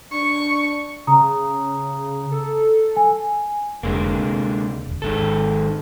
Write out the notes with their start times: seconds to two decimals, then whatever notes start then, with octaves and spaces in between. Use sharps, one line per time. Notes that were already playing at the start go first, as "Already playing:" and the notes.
0.12 D4 C#6
1.07 C#3 A#5 D#6
2.32 A4
2.96 G#5
3.83 F1 D3 G#3 A#3
4.16 D2 C3
4.87 E1 D2
5.02 G#1 D#3 G#3 A4